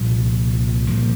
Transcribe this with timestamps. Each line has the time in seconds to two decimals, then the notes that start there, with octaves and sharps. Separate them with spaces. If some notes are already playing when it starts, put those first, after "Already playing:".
Already playing: C2 A#2 F3 A#3
0.89 A#2 F3 A#3